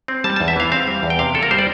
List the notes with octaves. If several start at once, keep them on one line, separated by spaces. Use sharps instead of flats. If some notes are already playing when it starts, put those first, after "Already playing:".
C4
G3 A5
A5
E2
E5
E3 F5
C4 F5
G3
E2
G5
C3 F5
A#3 A4
A#4
G3 C5
D5